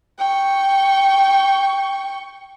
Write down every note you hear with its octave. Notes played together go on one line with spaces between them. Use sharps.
G5 C#6